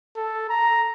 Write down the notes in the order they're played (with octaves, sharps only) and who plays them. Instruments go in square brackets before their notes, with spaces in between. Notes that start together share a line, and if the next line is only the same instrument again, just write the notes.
[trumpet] A4
A#5